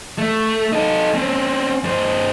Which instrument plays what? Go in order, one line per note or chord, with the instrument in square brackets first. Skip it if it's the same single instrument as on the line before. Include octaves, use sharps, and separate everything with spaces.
[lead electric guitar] A3
D#4 A4
C4 C#4
G2 C5